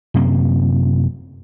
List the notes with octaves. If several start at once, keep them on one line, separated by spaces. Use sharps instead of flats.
F#2 C3 A#3